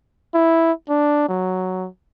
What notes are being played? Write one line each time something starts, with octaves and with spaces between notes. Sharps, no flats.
E4
D4
F#3